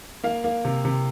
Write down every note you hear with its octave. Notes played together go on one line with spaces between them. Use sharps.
A#3 F5
A#3
C3
C3